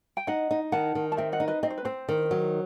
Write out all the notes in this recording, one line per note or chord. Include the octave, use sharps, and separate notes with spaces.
G5
D#4 D#5 F#5
D#4
D#3 F#5 A5
D#3
A5
C4 E5 G5
D#5 F#5
D#4
B4 D#5
C4 D#5
C5
B4
C4 C5
D#3
F#3